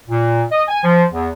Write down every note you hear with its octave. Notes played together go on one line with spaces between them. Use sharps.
A#2
D#5
G#5
F3
E2